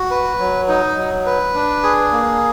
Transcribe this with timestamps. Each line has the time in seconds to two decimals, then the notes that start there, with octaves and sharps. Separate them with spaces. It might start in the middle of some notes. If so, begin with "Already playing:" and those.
Already playing: F#4
0.11 B4
0.39 F#3
0.68 D#4
0.96 F#3
1.26 B4
1.55 D4
1.83 G#4
2.12 A#3